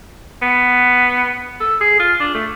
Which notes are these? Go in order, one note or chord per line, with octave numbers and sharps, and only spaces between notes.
B3
A4
G#4
F4
D4
A3